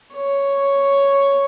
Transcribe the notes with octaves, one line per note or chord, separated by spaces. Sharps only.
C#5